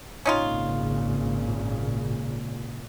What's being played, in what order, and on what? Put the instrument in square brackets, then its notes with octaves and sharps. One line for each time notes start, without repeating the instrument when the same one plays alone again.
[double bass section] G#1 A#2 C#3 [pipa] C#4 D#4 F4